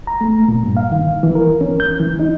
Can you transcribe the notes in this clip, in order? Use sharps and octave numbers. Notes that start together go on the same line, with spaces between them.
A#5
A3
A#2
G2
F5
D#3
E3
A#4
C#4
G6
E3
D#4